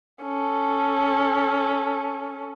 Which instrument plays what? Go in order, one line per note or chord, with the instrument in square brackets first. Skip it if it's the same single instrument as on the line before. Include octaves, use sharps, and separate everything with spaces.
[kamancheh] C#4 A4